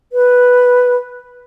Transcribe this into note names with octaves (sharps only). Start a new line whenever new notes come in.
B4